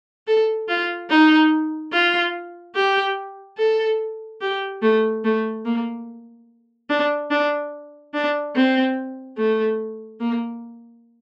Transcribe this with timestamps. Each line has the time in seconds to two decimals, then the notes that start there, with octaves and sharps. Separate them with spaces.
0.27 A4
0.68 F4
1.10 D#4
1.92 F4
2.75 G4
3.58 A4
4.41 G4
4.82 A3
5.24 A3
5.65 A#3
6.90 D4
7.31 D4
8.14 D4
8.55 C4
9.38 A3
10.20 A#3